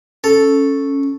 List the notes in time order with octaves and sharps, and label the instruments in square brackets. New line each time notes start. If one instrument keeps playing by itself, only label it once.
[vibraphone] C#4 [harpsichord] A4